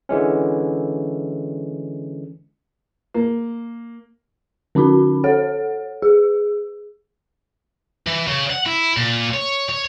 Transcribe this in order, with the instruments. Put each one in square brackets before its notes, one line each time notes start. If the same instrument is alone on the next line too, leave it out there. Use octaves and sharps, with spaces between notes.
[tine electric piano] D3 E3 G#3 C#4
[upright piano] A#3
[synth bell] D3 C#4 D#4 F#4 B5
A4 C#5 F#5
G#4
[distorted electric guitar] E3
C#3
F#5
E4
A#2
C#5
C#5